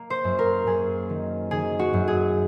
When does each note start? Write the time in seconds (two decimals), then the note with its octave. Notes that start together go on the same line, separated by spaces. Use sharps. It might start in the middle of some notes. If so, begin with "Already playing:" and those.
Already playing: A#3
0.10 C5
0.24 F#2
0.39 A#4
0.66 F#2 G#4
1.09 D#3
1.51 D#3 G#4
1.79 F#4
1.93 F#2
2.08 G#4